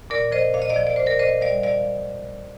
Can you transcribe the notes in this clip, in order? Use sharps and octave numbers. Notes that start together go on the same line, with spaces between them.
A#2 A#4 D5
F3 C5 D#5
A#2 F5
D#5
D5 F5
F3
D5
A#2 C5
A#4 D5
A#2 C5 D#5
G3 D5 F5
G3 D5 F5